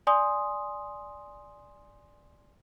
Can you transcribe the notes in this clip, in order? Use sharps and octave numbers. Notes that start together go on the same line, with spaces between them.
D5 G#5 C6 D#6